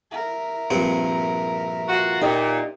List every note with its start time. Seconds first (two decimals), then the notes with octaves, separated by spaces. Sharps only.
0.11 A#4 E5
0.70 A#1 G2 C4
1.88 F4 F#4
2.21 A#2 D#4 G4 D#5